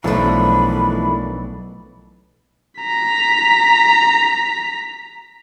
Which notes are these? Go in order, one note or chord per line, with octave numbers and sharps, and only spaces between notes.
B1 E3 F3 A3 A#3 D4 B5
A#5 B6